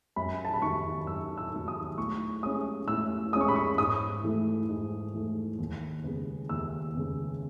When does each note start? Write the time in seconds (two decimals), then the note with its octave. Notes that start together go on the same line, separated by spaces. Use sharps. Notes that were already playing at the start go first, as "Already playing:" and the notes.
0.16 F#2 B5
0.45 A5
0.54 B5
0.62 D#3 F#3 C#6
1.07 F#2 E6
1.37 E6
1.53 D#3 F#3
1.68 D#6
1.98 A2 C#6
2.43 G#3 C#4 D#6
2.88 A2 E6
3.33 G#3 D#6
3.36 C#4 C#6
3.48 B5
3.56 C#6
3.78 G#2 D#6
4.23 E3 A3
4.69 G#2
5.14 E3 A3
5.59 D#2
6.04 C#3 G#3 B3
6.49 D#2 E6
6.94 C#3 G#3 B3